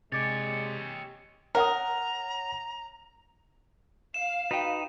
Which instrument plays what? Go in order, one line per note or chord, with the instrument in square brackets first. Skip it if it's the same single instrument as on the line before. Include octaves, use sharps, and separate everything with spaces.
[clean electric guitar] C3 D5 [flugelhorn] G#3 [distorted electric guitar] G4 C#5 [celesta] A6
[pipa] A#4 [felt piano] C#5 F#5 D#6 [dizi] A#5
[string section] F5 [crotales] E7
[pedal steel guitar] D#4 B4 [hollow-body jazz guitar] F#4 G5